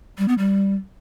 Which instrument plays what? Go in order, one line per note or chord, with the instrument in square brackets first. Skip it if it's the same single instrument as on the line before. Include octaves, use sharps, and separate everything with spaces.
[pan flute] G3
B3
G3